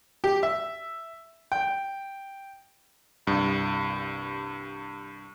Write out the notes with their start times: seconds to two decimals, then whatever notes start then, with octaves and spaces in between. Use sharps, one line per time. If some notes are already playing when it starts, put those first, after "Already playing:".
0.24 G4
0.43 E5
1.52 G5
3.27 C2 G2